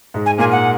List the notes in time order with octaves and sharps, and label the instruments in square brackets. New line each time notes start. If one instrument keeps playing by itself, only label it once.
[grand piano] G#2 G#3
[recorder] G#5
[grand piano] A#2 A#3 [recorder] G#5
[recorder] F#5